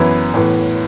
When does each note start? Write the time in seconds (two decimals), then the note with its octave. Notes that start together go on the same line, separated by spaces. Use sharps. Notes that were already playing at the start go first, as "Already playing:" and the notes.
Already playing: F#2 E3 B3 E4 B4
0.34 A2 E3 B3